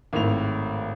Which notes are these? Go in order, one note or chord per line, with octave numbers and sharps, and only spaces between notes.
G#1 A2 F7